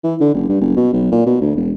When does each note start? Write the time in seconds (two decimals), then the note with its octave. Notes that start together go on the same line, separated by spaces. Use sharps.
0.04 E3
0.21 D3
0.34 F#1
0.49 G2
0.61 F#1
0.76 B2
0.93 B1
1.12 A#2
1.27 B2
1.41 D2
1.56 E1